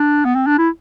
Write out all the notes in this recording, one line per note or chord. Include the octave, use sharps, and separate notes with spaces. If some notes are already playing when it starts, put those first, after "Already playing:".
Already playing: D4
B3
C4
D4
E4